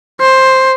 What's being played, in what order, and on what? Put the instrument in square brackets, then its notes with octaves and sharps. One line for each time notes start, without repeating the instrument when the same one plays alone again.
[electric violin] C5